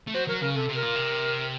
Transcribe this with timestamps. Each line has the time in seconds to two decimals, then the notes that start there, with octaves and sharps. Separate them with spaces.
0.07 A3
0.14 F#3 C5
0.27 F#3 A#4
0.41 C#3 A#4
0.55 C3 A4
0.69 C3
0.75 A#4
0.82 A#2
0.95 C3